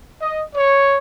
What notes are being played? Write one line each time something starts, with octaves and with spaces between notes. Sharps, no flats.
D#5
C#5